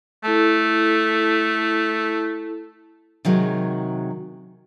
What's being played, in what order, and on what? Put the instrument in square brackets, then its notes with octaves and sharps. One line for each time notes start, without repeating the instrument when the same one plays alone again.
[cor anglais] A3 [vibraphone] E4 A4 A5
[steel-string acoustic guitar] C3 D#3 F#3 G#3